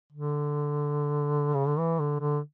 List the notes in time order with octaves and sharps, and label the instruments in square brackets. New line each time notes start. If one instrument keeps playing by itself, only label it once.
[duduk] D3
C#3
D3
E3
D3
D3